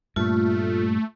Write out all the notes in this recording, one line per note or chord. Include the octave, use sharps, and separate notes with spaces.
G2 A#2 A3 F4